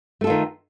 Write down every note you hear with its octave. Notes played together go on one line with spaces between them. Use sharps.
D#3 A3 F4 A4